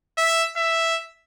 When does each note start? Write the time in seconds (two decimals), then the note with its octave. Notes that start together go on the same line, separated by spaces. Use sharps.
0.18 E5
0.57 E5